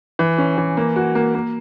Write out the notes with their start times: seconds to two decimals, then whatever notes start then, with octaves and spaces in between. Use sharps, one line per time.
0.19 E3
0.38 C#4
0.58 E3
0.77 A#3
0.96 F#4
1.15 A#3
1.35 A#3